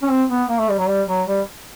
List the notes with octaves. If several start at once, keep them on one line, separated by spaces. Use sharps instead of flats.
C#4
C4
B3
A#3
A3
G3
F#3
G3
F#3
G3